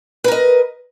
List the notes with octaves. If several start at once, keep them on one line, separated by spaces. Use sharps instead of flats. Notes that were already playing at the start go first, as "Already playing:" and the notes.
A#4 B4 D#5